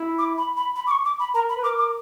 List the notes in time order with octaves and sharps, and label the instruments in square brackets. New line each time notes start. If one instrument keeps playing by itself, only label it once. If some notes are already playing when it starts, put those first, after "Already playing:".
Already playing: [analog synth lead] E4
[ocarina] D6
B5
B5
B5
D6
C#6
D6
B5
[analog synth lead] A#4 [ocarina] A#5
[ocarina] B5
[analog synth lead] B4
[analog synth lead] A#4 [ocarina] D6
[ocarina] D6